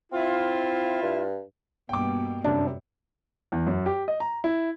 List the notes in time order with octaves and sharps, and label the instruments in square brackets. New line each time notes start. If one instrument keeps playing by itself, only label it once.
[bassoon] C4 [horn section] E4 F4
[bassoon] G2
[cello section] G2 B2 A#3 [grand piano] G5 D6
[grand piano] F#2 C3 G3 [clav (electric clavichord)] D4
[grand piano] E2
F#2
G4
D#5
A#5
E4